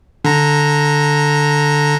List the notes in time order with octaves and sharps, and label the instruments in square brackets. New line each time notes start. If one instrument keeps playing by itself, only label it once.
[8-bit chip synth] D3 A#5